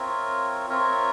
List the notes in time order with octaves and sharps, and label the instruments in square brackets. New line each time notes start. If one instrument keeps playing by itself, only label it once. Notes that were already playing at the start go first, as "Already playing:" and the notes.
Already playing: [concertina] C4 F4 A#4 C#5 E5
C4 F4 A#4 C#5 E5